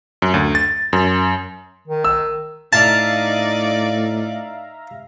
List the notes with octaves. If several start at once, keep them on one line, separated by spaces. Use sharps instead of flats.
F#2
D2
A6
F#2
D#3
E6
A2 D#4 D5 E5 F5 A5 A#5